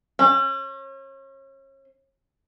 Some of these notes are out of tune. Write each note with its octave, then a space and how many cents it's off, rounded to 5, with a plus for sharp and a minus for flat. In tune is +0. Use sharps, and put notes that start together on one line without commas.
C#4 -35